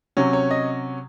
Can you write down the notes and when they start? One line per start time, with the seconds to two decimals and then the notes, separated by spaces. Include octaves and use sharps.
0.17 C3 F#3 C#4
0.33 C#5
0.51 D#5